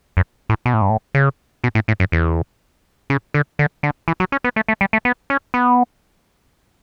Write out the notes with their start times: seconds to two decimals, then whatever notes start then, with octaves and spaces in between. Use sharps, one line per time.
0.17 F#2
0.49 A2
0.66 B2
0.74 A2
0.82 G2
0.90 A2
1.15 C#3
1.64 B2
1.75 A2
1.88 A2
2.00 F#2
2.12 E2
3.10 C#3
3.34 D3
3.59 D3
3.83 D3
4.08 E3
4.20 F#3
4.32 C#4
4.44 B3
4.56 A3
4.68 A3
4.81 G3
4.93 A3
5.05 B3
5.30 C#4
5.54 B3